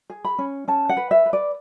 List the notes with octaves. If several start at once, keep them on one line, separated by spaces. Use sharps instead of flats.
G#4
B5
C#4
C#4 A5
F#5
B4
E5
B4
D5